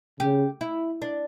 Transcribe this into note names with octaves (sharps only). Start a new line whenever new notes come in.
C#3 G4
E4
D4